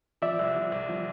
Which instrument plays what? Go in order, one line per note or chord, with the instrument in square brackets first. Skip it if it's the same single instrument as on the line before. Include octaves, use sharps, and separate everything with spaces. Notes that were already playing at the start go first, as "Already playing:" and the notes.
[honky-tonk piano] F3 [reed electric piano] D5 E5
[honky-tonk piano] C2
F3
C2
F3